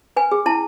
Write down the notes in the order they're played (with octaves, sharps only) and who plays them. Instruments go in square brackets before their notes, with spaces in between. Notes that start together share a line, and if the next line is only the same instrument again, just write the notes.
[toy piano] B4 G#5
G#4
E4 A5